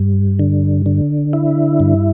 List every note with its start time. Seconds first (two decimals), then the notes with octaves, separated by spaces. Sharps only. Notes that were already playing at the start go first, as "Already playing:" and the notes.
Already playing: G2
0.39 D3
0.86 D3
1.33 E4
1.80 G2